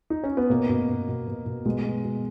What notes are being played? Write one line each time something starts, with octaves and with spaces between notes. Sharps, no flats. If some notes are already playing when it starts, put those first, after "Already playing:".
D#4
C#4
B3
B2 A#3
B2
B2
B2
B2
B2
B2 G#3
B2
B2